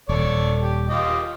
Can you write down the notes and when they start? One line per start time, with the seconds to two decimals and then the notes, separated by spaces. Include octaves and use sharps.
0.09 D#1 A4 C#5 D5
0.62 G4
0.89 F4 G4 D#5